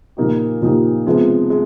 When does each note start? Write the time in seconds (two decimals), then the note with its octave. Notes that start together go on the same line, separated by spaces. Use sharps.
0.17 A#2 F3 A#3 D#4 G4
0.62 A#2 F3 A#3 D#4 G4
1.06 C3 F3 G#3 B3
1.50 G#3